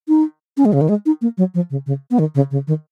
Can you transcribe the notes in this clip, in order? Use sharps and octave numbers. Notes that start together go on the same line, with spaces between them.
D#4
C#4
G#3
C#3
D#3
G#3
D#4
A#3
F#3
F3
C#3
C#3
B3
D#3
C#3
C#3
D#3